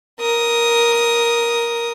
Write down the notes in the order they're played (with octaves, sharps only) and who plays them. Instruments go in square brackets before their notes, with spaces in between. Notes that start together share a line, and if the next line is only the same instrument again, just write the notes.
[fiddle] A#4 D#6